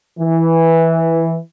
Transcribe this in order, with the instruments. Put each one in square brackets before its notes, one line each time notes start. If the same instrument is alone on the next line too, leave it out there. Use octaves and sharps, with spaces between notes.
[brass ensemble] E3